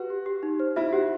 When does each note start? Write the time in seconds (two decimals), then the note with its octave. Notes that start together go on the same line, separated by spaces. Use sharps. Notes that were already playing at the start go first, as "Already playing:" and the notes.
Already playing: F#4 G4 B4
0.10 G4
0.26 G4
0.43 D#4
0.60 C5
0.76 E4 E5
0.93 F#4 G4